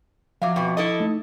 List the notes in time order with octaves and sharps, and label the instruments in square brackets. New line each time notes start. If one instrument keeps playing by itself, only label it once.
[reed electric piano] F3 E5 D6 [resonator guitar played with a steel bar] F#3 F5
[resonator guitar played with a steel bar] F2 B2
E4 A4 D#5
[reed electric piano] A3 D#4